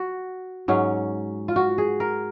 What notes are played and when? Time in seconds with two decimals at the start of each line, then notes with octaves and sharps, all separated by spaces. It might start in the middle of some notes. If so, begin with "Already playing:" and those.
Already playing: F#4
0.68 G#2 F#3 C#4
1.48 F4
1.56 F#4
1.78 G#4
2.00 A#4